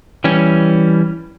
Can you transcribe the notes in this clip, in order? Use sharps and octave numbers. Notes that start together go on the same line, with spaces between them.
E3 G3 C#4